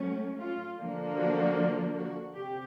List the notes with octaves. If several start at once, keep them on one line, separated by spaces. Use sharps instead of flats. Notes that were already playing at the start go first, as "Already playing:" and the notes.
Already playing: F#3 A3 C#4
F4
D3 F3 A#3 D4
F#4
F#4
C3 G4